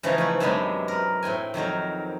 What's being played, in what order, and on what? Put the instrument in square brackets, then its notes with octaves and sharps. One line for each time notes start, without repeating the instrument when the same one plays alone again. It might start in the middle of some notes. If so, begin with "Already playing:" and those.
[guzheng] C#3 E3 F3 C#4 D#4
A3 E4 B4
F#2 C3 F#3 G#3 B3 D4
A#4 B4
A2 C4 G5 G#5
F2 D#3 F#3 A#4